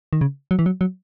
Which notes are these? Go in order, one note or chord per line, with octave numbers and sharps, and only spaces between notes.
D#3
C#3
F#3
E3
F#3
F#3